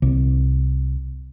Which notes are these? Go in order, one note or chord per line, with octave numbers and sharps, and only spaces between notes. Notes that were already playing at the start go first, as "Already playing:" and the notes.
C2